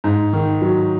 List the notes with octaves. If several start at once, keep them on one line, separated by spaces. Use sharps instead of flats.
G#2
D#3
F#3